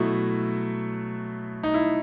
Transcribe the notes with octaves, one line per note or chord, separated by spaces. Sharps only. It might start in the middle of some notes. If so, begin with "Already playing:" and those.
Already playing: B2 F#3 A3 E4
D#4
E4